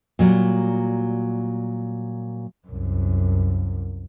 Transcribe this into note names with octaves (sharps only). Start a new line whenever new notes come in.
A#2 F#3 G3
C2 F#2